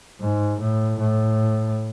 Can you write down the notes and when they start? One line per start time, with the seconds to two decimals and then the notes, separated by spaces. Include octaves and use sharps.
0.21 G#2
0.60 A2
1.00 A2